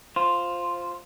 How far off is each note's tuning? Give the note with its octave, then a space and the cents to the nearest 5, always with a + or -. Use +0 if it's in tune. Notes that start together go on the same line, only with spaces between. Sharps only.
F4 +0 C5 +0